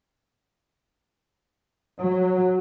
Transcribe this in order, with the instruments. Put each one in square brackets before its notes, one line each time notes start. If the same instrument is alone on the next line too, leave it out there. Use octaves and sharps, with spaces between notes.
[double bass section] F#3